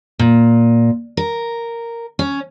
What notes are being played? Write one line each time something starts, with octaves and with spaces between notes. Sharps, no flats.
A#2
A#4
C#4